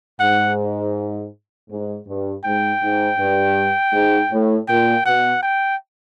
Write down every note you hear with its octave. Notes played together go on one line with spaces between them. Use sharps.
G#2 F#5
G#2
G2
G#2 G5
G#2
G2
G#2
A2
A#2 G5
B2 F#5
G5